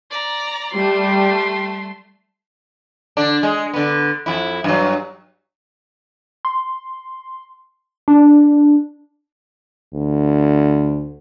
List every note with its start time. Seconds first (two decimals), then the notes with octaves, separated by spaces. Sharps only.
0.11 D5 A#5
0.74 G3 A3 C6
3.17 D3 D4
3.43 G#3
3.74 D3 B3
4.26 F2 E4
4.64 G2 F#3
6.45 C6
8.08 D4
9.93 D2